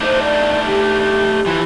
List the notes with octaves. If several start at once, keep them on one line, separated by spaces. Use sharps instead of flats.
A3 D4 D#4 C5
D5
G4
E3 F3